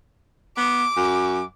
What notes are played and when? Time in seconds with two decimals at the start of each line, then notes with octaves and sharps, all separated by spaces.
0.57 B3 D6
0.97 F#2